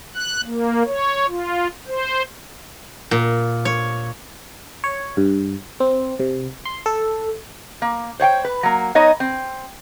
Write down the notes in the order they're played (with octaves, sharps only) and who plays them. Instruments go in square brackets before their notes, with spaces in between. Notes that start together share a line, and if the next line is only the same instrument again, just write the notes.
[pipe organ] F#6
A#3
C#5
F4
C5
[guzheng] A#2
C#5
[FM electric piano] C#5
G2
C4
C3
C6
A4
[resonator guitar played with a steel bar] A#3
C5 C#5 F#5 G5
B4
F#3 A#3
B3 D#4 C#5 D#5
C4